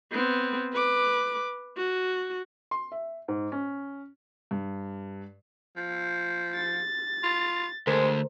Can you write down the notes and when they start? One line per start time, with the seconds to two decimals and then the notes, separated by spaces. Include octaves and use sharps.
0.12 B3 C4
0.73 B4 D6
1.77 F#4
2.71 C6
2.92 E5
3.28 G#2
3.52 C#4
4.51 G2
5.76 F3
6.55 A6
7.23 F4
7.87 D2 G#3 A#4 C5